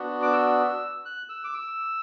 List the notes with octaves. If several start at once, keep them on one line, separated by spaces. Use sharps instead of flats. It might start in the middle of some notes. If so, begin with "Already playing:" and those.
Already playing: B3 D4 F#4
D6
E6
F#6
E6
D6
E6